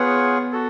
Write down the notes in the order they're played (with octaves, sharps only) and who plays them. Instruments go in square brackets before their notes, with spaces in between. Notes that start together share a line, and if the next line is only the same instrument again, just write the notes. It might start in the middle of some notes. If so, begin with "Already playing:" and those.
Already playing: [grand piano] B3 [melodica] F4 G#4 C#5 F#5
[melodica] F#4 A4